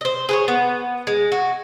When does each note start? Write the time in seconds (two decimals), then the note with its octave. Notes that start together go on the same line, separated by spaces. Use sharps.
0.01 C5 D#5
0.29 G#4 B4 C#5
0.48 B3
1.07 G#3
1.32 F#4